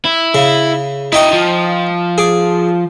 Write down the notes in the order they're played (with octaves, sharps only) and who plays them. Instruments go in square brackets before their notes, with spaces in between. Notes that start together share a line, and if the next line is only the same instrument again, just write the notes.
[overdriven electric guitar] E4
[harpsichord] C#3
[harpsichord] D#4 G5 C#6 [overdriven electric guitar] E4 D#5
[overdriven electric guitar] F3
[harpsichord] G#4 D6